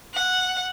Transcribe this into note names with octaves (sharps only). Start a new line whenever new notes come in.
F#5